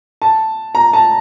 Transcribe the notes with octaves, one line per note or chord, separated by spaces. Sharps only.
A5
A#5
A5